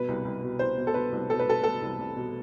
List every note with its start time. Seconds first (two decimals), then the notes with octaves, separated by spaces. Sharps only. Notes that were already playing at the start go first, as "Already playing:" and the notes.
Already playing: B2 B4
0.08 C2
0.25 C2
0.43 B2
0.59 C2 C5
0.77 B2
0.87 A4
0.94 B2 B4
1.12 C2
1.30 B2 A4
1.39 B4
1.47 B2 A4
1.63 B2 A4
1.82 C2
1.99 C2
2.16 B2